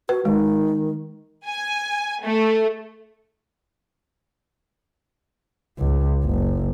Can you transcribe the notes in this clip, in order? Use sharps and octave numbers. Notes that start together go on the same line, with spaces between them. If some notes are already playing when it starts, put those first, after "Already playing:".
F#4 B4
D#3 G#3
G#5
A3
C#2
F#1